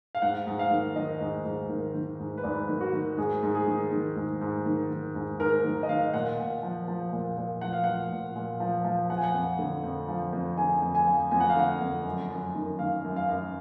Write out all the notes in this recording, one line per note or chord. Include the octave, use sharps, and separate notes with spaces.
F5
G#2 F#5
G#2
F5
D#3
D#3 D#5
G#2
G#2
D#3
D#3
G#2
B4
G#2 D5
D#3
F#4
D#3
G#2 G#4
G#2
G#4
D#3
D#3
G#2
G#2
D#3
D#3
G#2
G#2 A#4
D#3
D#5
D#3 F5
A#2 F#5
A#2
F3
F3
A#2
A#2
F3 F#5
F5
F3 F#5
A#2
A#2
F3
F3
F3 F#5
G#5
F#5
F2
D3
F2
F3
F2
D3 G#5
F2
G#5
F3
F2 G#5
F#5
F5
D3 F#5
F2
F#2
F#2
D#3
D#3 F5
F#2
F5
F#2